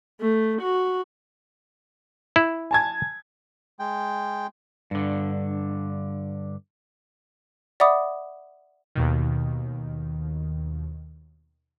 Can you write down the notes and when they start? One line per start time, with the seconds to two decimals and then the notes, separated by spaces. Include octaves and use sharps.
0.21 A3
0.62 F#4
2.36 E4
2.71 G#5 A5 G#6
3.79 G#3 G5
4.91 G2 D3
7.80 D5 E5 F#5 B5 D6 D#6
8.95 D#2 B2 D#3